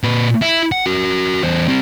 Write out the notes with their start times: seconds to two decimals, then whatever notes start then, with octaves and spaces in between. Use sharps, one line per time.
0.03 A#2 B4
0.42 E4
0.72 F#5
0.86 F#4 A#4
1.43 E2 C5
1.68 G3 C4